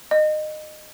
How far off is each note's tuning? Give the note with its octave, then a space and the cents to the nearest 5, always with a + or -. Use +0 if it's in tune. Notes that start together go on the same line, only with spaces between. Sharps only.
D#5 -25